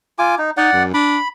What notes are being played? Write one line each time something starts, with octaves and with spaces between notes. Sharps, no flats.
F4 G#5 D6
D#4
D#4 D5 F#5
F#2
D4 B5